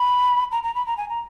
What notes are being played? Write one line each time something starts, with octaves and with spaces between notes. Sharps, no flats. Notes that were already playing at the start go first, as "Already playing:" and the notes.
Already playing: B5
A#5
A#5
B5
A#5
G#5
A#5